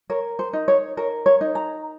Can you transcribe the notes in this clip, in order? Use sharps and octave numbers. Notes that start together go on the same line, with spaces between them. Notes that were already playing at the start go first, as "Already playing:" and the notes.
A#4 C#5
C5
D#4
C#5
A#4 C#5
C#5
D#4
A#5